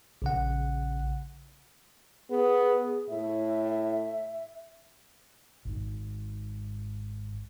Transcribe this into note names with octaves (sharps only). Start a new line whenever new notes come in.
A#1 C#3 F#5
B3 G#4
A2 E5
G#1 G#2